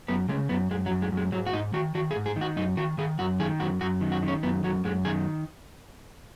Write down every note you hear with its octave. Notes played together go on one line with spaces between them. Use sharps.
F#2 B3
C#3 G#3
F#2 B3
F#2 G#3
F#3
F#2
G#3
F#2
G#3
G#2 F#3
F#4
G#2 D#4
D#3 F#4
D#3 F#4
G#4
G#2
G#4
D#3
F#4
F#2 D#4
D#3 F#4
D#3 G#4
F#2 F#4
D#3 G#4
F#2 F#4
F#2 F#4
D#3
F#4
D#3
C#4
F#2 B3
F#2 F#3
F#2 G#3
D#3 G#4